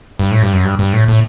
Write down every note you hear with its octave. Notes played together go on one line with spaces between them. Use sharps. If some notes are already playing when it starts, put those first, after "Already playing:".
G2
A2
G2
F#2
G2
G2
A2
A2